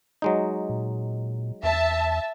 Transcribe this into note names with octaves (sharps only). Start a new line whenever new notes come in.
F#3 G#3 D#4
A#2
E2 E5 A5